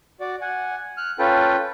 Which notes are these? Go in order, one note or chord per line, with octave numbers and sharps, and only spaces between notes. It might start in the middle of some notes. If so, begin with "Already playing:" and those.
F#4 D5
F#5 G#5
F6 F#6
C#4 F4 A4 B4 G5